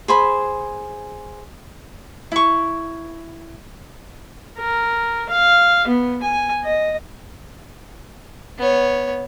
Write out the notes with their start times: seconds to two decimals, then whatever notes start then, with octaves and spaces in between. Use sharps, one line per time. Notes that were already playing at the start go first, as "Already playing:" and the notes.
0.08 G#4 C5 B5
2.32 E4 C#6
4.58 A#4
5.29 F5
5.87 B3
6.23 G#5
6.64 D#5
8.58 B3 C#5